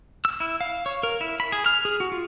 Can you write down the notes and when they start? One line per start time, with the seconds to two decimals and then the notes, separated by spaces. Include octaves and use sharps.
0.25 E6
0.40 E4
0.61 F5
0.86 C#5
1.03 A#4
1.21 E4
1.40 B5
1.52 G#4
1.66 F6
1.85 G#4
2.00 F#4
2.12 F4